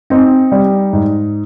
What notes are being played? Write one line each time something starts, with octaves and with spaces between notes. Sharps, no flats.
C4 D#4
G3
G#2